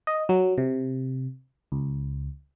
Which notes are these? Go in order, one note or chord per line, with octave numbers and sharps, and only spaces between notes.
D#5
F#3
C3
C#2